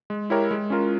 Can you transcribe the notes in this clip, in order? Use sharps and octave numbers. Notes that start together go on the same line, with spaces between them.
G#3
E4 G4 A#4 C#5
G#3
C#4 F4 A#4